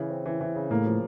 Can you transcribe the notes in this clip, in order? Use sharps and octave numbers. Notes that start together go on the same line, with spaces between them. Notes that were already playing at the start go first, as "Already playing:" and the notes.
Already playing: C#3 E3
C4
E3
E3
C#3
A2 A#3
F3